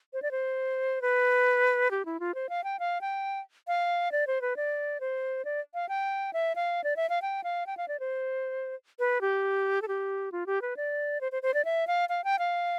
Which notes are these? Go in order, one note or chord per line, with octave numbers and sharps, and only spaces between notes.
C5
D5
C5
B4
G4
E4
F4
C5
F5
G5
F5
G5
F5
D5
C5
B4
D5
C5
D5
F5
G5
E5
F5
D5
E5
F5
G5
F5
G5
F5
D5
C5
B4
G4
A4
G4
F4
G4
B4
D5
C5
C5
C5
D5
E5
F5
F5
G5
F5